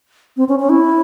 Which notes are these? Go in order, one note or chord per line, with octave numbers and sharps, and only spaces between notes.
C4
C#4
C#4
E4